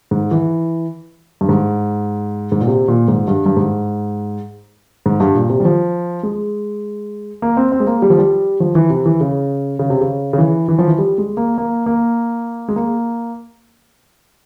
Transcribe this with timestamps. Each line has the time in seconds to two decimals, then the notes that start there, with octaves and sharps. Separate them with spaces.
0.11 G#2
0.31 E3
1.41 G2
1.49 G#2
2.52 G#2
2.61 A#2
2.67 C3
2.88 A#2
3.08 G#2
3.28 G2
3.46 G2
3.57 G#2
5.06 G#2
5.20 G2
5.34 A#2
5.50 C3
5.60 G3
5.65 F3
6.23 G#3
7.42 A#3
7.57 C4
7.72 C4
7.80 G#3
7.87 A#3
8.02 G3
8.10 F3
8.19 G3
8.60 F3
8.75 E3
8.90 C3
9.06 E3
9.20 C#3
9.79 C#3
9.90 C3
10.01 C#3
10.33 C#3
10.38 E3
10.68 E3
10.78 F3
10.87 E3
10.98 G3
11.18 G#3
11.37 A#3
11.58 A#3
11.86 A#3
12.68 G#3
12.76 A#3